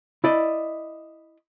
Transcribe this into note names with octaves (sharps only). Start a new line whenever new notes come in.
E4 D5 D#5